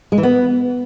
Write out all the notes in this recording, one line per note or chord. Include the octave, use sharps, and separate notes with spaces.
G#3
E3
B3